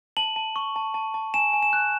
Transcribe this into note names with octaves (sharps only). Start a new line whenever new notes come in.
A5 F#7
A5
C#6
A5
A5
A5
G#5 E7
G#5
E7
F#6